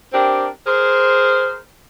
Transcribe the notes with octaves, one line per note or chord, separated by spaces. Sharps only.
C4 D4 G4 A#4
G#4 A#4 C5